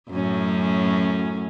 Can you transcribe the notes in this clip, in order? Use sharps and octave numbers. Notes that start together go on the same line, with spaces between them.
F#2 A2 C#4